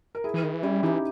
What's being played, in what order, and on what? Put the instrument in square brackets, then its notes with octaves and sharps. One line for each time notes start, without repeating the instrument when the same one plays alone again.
[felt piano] A#4
E4 G#4
[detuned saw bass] E3
D#3
E3
[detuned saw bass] G3 [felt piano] C#4 E4
[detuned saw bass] E3 [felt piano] D#4 G4